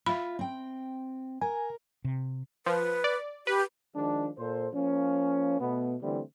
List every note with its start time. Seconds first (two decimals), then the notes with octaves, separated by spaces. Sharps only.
0.06 F4 E5 B5
0.39 C4 G5
1.41 A#4 G#5
2.04 C3
2.66 F3 B4
3.04 D5
3.47 G4 B4
3.95 D#3 F3 G#3 D4
4.38 A#2 A4 C5
4.74 F3 A#3 C#4
5.60 B2 A3 B3
6.02 D3 E3 G3 A3 C4